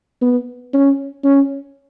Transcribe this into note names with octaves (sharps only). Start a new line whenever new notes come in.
B3
C#4
C#4